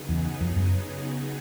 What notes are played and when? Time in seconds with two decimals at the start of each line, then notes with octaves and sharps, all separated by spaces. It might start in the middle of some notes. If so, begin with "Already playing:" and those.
Already playing: C#3 F#3 B3 D#4 G#4
0.09 E2
0.41 F2
0.56 F#2